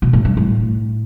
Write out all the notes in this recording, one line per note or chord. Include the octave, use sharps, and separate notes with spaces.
B2
A2
G2
A2